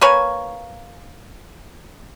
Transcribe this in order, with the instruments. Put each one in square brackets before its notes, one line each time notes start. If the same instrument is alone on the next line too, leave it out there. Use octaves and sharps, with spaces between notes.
[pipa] A#3 B4 C#5 G#5